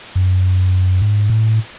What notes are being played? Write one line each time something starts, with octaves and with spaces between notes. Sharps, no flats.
F#2
G#2
A2